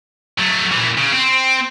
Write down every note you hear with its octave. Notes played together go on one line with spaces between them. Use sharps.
F#3 A3
A#2 E3
C#3
C4